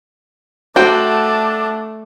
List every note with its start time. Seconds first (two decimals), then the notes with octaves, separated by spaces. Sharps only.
0.76 A3 D4 F#4 C5 G5